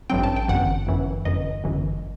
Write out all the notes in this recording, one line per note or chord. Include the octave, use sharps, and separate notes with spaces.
A1 G2 F#3 C4 G5
A5
G5
G1 F#2 E3 F#5
G1 F#2 E3
G1 F#2 E3 D#5
G1 F#2 E3